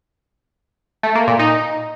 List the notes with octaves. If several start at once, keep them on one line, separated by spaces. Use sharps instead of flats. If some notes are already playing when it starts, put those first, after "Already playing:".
A3
A#3
A#2
D#4